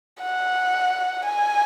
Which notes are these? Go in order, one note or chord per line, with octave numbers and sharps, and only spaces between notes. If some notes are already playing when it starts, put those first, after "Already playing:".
F#5
G#5